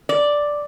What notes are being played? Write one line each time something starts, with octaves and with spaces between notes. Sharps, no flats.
D5